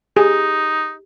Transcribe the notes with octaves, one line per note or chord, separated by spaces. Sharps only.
D#4 G4 G#4